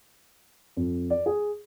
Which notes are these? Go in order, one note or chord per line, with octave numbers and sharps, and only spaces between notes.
F2
D5
G#4